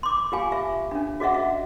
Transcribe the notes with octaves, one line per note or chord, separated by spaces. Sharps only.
C6 D6
F4 G4 F5 G#5
E5
C#4 D4
F#4 G#4 D#5 E5 F#5
E5